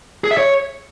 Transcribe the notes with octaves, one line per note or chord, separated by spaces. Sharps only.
G#4
E5
C#5